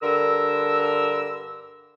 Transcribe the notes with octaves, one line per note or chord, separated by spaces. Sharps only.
G2 D3 A#4 E6